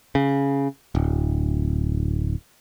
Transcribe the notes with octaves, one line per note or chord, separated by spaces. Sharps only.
C#3
D1